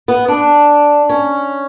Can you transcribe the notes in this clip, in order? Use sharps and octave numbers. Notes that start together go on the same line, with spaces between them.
B3
D4
C#4